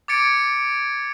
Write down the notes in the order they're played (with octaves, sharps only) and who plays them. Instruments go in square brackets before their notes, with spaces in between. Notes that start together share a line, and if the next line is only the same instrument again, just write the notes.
[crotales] D6 G#6 A6 C#7 D7